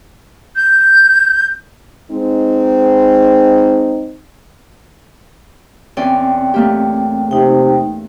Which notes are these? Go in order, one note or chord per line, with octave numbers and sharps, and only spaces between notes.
G6
G#3 C4 D#4
E2 C4 C#4 D5 G5
A3 A#3 G4
C3 D#4 G5